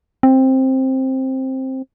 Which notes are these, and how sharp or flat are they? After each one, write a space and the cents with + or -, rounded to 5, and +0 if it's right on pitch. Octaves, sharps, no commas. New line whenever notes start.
C4 +10